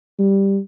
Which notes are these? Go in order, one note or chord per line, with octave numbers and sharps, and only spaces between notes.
G3